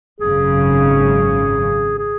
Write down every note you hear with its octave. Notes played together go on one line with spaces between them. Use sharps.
G#1 F#2 C#3 G#4
G#4